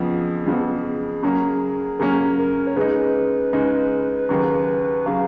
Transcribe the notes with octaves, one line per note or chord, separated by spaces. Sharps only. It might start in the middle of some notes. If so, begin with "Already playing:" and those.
Already playing: F2 C#3 F3 B3 G#4
F2 C#3 F3 B3
C#3 F#3 A#3 C#4
C#3 F#3 A#3 C#4 A#4
A#4
C#5
C#3 G#3 D#4 B4
C#3 G#3 D#4
D#2 C#3 F#3
C#3 F#3 F5